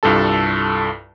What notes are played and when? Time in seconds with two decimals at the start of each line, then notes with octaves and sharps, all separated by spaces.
0.03 C2 G2 F4 A4 A5